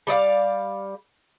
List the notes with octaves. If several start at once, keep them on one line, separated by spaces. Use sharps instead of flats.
G3 D5 D#5 F5